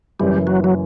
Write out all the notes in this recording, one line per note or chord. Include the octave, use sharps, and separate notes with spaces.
F#1 F#2 E3 G3
F#3
F#3